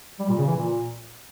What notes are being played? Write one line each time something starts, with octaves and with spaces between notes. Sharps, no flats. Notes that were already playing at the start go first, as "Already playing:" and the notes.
G3
A#2
C#3
E3
A#2